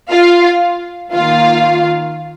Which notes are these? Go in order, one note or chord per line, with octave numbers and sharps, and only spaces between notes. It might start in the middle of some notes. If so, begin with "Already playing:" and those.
F4 F5
D#3 A#3 F4 F5